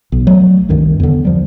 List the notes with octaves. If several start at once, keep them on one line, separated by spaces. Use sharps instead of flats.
B1
F#3 A3
C2 G2 D#3
E2 D3
F3 G3